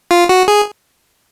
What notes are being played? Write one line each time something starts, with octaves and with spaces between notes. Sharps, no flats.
F4
F#4
G#4